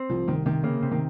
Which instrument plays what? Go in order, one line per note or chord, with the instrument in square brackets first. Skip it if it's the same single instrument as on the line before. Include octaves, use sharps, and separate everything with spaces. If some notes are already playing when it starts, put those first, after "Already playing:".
Already playing: [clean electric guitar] C4
[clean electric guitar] C2 [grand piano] F3
[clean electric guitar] C2 [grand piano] D#3
[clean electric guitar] C3 [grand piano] D#3
[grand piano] C#3 [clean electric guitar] A#3
[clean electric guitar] C3
[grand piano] D#3